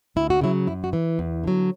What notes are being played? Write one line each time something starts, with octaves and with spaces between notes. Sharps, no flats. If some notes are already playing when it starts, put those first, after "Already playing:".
D2 E4
F#4
C#3 F#3 E4
F#2 E4
F#4
E3
E2
D3 F#3